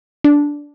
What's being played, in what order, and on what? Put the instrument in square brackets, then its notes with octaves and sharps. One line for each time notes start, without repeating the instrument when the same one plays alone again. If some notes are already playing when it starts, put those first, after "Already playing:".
[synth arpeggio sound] D4